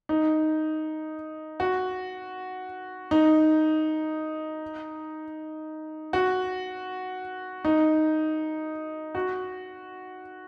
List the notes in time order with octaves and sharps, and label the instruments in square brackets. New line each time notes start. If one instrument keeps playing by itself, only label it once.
[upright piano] D#4
F#4
D#4
F#4
D#4
F#4